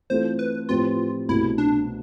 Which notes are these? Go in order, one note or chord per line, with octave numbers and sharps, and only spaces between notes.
E3 A3 C4 F4 A4 C5
B4
A2 F3 C4 F4 G4 B4
C2 B2 A3 E4
D4